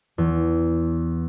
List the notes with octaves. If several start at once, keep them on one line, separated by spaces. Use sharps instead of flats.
E2